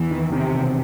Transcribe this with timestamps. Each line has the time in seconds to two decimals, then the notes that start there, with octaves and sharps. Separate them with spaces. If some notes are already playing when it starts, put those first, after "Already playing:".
Already playing: E2 E3
0.11 D#3
0.32 C3 D#3
0.54 E1